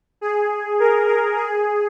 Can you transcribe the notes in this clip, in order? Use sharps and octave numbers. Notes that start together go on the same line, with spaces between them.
G#4
A#4
A#4
G#4